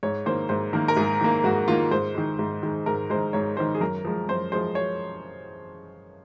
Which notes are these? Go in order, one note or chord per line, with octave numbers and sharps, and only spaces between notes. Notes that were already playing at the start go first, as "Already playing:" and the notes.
G#2 C#5
D#3 A#3 C5
G#2 C5
D#3 A#3 A#4
A#4
G#2 G#4
D#3 A#3
G#2 F#4
D#3 A#3 F4
G#2 C5
D#3 G#3
G#2
D#3 G#3
G#2 A#4
D#3 G#3 C5
G#2 C#5
D#3 G#3 C5
G#4
F#2 A#4
F3 G#3
F#2 C5
F3 G#3 C5
C#5